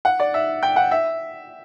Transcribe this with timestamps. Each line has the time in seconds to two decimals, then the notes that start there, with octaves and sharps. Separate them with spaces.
0.05 F#5
0.20 D5
0.34 E5
0.63 G5
0.76 F#5
0.91 E5